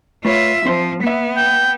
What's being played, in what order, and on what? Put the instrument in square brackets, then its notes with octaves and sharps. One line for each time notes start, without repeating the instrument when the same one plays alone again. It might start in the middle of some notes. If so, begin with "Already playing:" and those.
[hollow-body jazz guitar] A3 B4 C#5 [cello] F4 E5
[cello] F3 [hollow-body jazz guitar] C4 C5 C6
[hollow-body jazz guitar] A#3 E5 [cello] B3
[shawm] G5